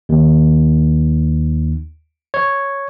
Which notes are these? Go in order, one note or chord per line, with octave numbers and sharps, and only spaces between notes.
D#2
C#5